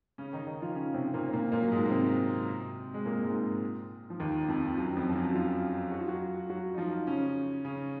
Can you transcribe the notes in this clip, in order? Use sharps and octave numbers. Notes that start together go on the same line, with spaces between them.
C#3 C#4
D#3 D#4
D#3 D#4
F3 F4
C#3 C#4
C3 C4
A#2 A#3
C4
A#2 A#3
A#2 A#3
F#3
G#2 G#3
A#3
C3 C4
G#3
A#2 A#3
G#2 G#3
F3
D#2 D#3
F2 F3
F#2 F#3
F2 F3
F3
F#2 F#3
F3 F4
F#4
F4
F#3 F#4
F#3 F#4
D#4
F3 F4
C#3 C#4
C#3 C#4